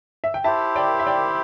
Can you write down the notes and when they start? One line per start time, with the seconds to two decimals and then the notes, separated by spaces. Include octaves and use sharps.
0.24 E5
0.34 G5
0.44 E4 G4 C5 E5 A5
0.76 D5 G5
0.99 E5
1.06 D5 G5